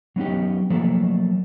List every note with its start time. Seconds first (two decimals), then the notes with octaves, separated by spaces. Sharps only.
0.16 F#3 B3 C#4 D#4 G4
0.70 F3 F#3 A3 A#3 A4